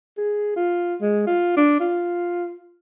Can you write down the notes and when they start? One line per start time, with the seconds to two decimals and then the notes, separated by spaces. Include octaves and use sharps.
0.17 G#4
0.56 F4
1.01 G#3
1.27 F4
1.56 D4
1.80 F4